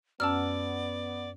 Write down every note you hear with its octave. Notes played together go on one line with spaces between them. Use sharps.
F#2 B3 C#4 D5 A5 E6 F6